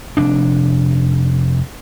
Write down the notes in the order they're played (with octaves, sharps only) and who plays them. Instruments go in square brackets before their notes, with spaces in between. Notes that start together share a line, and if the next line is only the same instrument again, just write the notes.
[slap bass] F1 D4